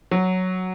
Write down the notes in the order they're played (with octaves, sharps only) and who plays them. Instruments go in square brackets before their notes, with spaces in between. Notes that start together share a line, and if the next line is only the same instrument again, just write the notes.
[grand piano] F#3